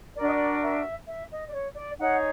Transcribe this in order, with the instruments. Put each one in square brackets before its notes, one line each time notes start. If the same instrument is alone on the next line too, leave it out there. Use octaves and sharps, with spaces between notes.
[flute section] D4 F#4 A#4 D5
D#5
D5
E5
E5
D#5
D5
C#5
D5
D#4 G#4 C#5 F#5